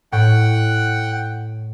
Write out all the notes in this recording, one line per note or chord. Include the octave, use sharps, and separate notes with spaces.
A2 F#5 G5